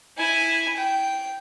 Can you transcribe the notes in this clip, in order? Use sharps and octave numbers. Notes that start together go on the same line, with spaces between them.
E4 G#5
G5